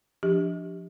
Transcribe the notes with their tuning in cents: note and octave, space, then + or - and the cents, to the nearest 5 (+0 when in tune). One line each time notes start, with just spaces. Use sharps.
F3 +0 D4 +0 G4 +0